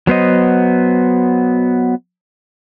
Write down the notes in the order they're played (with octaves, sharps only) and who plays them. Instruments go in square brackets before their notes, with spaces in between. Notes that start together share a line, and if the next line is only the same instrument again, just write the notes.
[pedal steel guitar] F#3 B3 C5 D#5